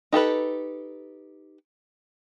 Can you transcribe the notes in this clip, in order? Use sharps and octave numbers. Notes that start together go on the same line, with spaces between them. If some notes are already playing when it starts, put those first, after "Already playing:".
D#4 G4 A4 B4